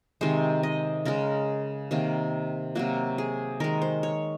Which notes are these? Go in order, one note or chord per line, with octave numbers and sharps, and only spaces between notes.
C3 D#3 G#3 C5
D#5
C#3 G#3 A#4
C3 D#3 A#3
C3 F#3 A#3 F#4
G#4
D#3 G#3 A#4
C5
C#5